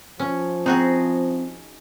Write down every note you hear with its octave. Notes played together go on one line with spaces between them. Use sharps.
F3 C#4
C4 D#4 F#4 G#4